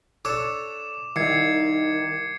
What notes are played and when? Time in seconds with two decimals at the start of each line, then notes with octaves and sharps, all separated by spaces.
0.25 D4 A4 C#5 D6 E7
1.16 C2 D#3 G#6 C7 C#7